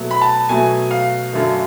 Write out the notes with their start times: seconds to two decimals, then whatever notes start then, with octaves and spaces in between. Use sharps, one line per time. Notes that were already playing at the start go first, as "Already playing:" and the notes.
Already playing: B2 F#3 A3
0.11 B5
0.21 A5
0.49 B2 F#3 A3 G#5
0.91 F5
1.33 F#2 D3 F#3 A3